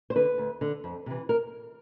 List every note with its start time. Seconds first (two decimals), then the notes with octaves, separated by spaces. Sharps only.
0.10 C5
0.15 D3 B4
0.38 D2
0.61 D3
0.84 F2
1.06 C3 E3
1.29 A#4